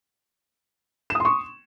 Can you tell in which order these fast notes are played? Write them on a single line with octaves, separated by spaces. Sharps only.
E7 D#6 C6 C#6